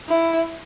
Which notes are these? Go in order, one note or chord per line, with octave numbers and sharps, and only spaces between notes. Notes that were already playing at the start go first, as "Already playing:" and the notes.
E4